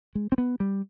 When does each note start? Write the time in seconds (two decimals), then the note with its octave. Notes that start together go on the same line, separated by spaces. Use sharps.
0.15 G#3
0.32 C4
0.38 B3
0.60 G3